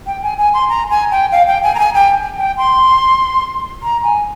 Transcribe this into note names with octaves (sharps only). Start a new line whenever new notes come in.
G5
G#5
G#5
C6
A#5
G#5
G5
F5
G5
G#5
A#5
G#5
G5
G5
C6
A#5
G#5